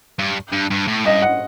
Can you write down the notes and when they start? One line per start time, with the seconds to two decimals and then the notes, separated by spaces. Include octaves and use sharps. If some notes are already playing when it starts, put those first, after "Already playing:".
0.19 G2
0.53 G2
0.71 G2
0.87 A2
1.05 G2 D#5
1.22 F#5